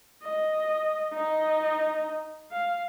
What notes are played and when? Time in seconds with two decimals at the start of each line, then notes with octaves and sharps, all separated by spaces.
0.23 D#5
1.13 D#4 D#5
2.51 F5